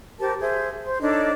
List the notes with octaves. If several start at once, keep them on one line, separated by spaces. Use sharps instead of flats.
G4 A#4 C5 A5
G#4 C5 E5
C5 C6
D4 D#4 A4 C#5